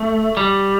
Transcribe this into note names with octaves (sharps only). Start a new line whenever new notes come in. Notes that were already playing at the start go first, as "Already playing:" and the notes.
Already playing: A3
G3